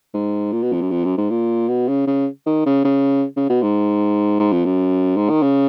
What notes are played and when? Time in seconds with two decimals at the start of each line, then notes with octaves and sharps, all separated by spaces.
0.14 G#2
0.52 A#2
0.62 B2
0.73 F2
0.81 F#2
0.91 F2
1.04 F#2
1.18 G#2
1.30 A#2
1.69 B2
1.88 C#3
2.07 C#3
2.46 D#3
2.66 C#3
2.84 C#3
3.36 C#3
3.50 B2
3.62 G#2
4.40 G#2
4.52 F2
4.65 F#2
5.17 G#2
5.29 D#3
5.42 C#3